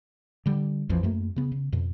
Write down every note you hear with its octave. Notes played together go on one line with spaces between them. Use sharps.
D3 G3
A#1 F2 E3 F3
F#2 A3 A#3
C#3 B3
C#3
F2 B2